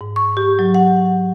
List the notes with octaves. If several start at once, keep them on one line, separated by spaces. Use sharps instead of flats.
G#2
C#6
G4
F#3
F#5